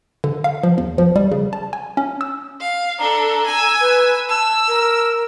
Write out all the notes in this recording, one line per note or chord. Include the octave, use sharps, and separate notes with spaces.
D3
F5
F3
E2
F3
G3
C#3
A5
G#5
C#4
E6
F5
D4 A4 A#5
G#5 E6
B4
A5 E6
A#4